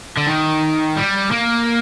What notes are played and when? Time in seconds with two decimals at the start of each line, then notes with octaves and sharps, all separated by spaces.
0.17 D3
0.27 D#3
0.97 G3
1.32 A#3